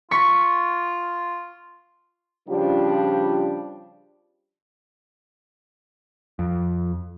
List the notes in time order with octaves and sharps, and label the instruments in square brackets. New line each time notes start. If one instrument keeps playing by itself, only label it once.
[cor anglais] F4 [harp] C#6 B6
[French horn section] C#3 F3 G3 D4 F4 G4
[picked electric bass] F2